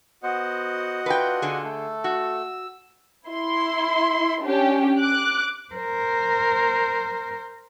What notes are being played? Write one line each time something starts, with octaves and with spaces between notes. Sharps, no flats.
B3 F#4 C5 D#5 F#5
D4 F4 B4 G5
D3 G#4
A3 A4
F#4 E6
E4 C6
C#4 D4 G4
D6 F#6
A#4 C5